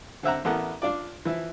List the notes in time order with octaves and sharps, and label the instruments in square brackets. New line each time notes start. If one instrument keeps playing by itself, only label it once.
[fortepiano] D3 C4 E5 F#5 A#5
A1 B3 E4 A4 A#4 F#5
D4 F4 D5
E3 F3 E4